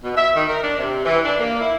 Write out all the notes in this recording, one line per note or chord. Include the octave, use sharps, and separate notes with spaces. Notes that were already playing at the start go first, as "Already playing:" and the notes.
B2
E5
D#3
A#4
D4
C3
E3
D4
A#3
E4